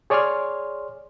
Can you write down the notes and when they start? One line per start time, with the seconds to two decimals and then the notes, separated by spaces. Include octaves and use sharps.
0.10 G#4 C#5 D5 G#5 C6 F6